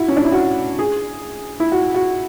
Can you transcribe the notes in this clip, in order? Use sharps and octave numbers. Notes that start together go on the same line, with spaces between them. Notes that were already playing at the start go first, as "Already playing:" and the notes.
Already playing: E4 F#4
C#4
D4
E4
F#4
G#4
E4
F#4
F#4